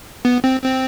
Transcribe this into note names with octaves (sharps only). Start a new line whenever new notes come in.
B3
C4
C4